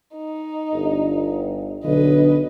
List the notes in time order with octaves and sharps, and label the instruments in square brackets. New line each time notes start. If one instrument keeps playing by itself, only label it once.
[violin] D#4
[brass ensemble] G1
[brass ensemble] B1 D3 [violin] B4 D#5